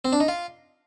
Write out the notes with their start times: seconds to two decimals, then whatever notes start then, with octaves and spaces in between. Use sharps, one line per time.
0.05 C4
0.12 D4
0.20 D#4
0.28 F4